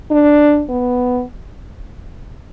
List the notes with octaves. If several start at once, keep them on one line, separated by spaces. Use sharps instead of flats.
D4
B3